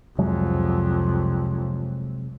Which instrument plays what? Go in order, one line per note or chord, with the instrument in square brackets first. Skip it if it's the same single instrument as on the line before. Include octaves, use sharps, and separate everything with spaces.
[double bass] C2 F2 [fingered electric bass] C3 F#3 G#3